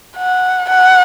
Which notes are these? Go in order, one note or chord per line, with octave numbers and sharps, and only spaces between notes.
F#5
F#5